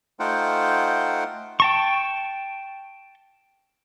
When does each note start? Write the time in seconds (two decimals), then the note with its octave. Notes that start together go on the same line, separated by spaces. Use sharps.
0.20 A3 D#4 F4 C5 F#5 G5
1.60 G5 A5 C#6